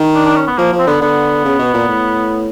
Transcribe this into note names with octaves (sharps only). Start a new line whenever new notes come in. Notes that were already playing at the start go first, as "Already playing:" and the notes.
Already playing: D#3
D4
D4
C#4
B3
F3 A#3
F3
C4
D3 B3
D3 B3
C#3
B2
A#2
A2